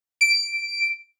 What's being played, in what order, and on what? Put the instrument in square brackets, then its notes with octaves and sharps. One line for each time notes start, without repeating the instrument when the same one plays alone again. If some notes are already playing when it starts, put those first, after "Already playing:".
[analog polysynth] D7